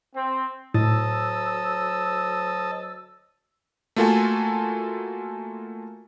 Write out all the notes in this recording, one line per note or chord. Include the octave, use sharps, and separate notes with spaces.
C4
D2 A2 F#3 D#5 A5 E6
A3 A#3 F4 F#4 A4 G#5